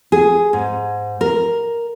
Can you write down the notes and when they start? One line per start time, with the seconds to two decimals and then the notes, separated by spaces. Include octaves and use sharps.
0.12 G#4
0.53 G#2
1.21 A#4